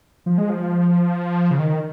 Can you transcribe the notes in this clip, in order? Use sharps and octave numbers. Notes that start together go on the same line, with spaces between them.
F3
G#3
F3
C#3
D#3